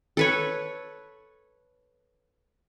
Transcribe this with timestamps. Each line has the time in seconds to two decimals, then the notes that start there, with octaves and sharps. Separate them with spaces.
0.17 A4 B4 C#5